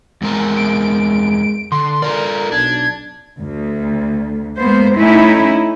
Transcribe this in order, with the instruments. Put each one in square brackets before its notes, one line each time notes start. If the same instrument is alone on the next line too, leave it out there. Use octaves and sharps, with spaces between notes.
[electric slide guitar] E2 C4 A#4 [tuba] G#3
[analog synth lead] D7
[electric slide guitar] D3 [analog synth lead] C6
[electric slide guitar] F4 A4 D5 [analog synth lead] A#4
[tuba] B1 [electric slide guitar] D4 [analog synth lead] G#6
[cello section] D2
G#3 A#3 B3 C5
A3 C#4 D#4 E4